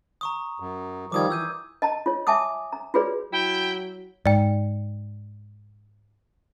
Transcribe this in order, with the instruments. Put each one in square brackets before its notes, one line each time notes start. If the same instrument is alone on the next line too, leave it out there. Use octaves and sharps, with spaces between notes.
[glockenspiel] A#5 C#6 D#6
[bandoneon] F#2
[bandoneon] D#3 F3 G3 [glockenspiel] D6 D#6 G#6
[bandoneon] E3 [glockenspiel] E6 G6 D#7
[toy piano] D#5 A5 A#5
F4 C#5
E5 G#5 A5 D6 D#6
A#5
F4 F#4 G#4 B4 C#5 D5
[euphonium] F#3 [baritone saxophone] E4 [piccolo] G5
[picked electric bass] G#2 [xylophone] D5 G5